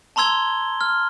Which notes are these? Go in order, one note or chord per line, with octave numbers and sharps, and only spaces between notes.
A5 A#5 C6 E6 G#6 G7
F6